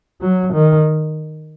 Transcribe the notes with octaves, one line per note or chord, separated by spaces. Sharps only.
F#3
D#3